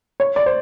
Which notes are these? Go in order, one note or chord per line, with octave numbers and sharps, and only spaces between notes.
C#5
D5
C5